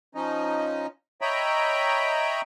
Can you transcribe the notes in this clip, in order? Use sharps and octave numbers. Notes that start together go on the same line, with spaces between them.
F3 C#4 D#4 D#5
C#5 D#5 E5 G5 A#5 B5